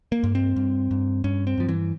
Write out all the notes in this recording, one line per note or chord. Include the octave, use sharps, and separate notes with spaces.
A#3
G2
C4
G2
G2
G2 C#4
C4
G2 F3
E3